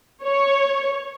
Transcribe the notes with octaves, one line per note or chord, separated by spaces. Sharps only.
C#5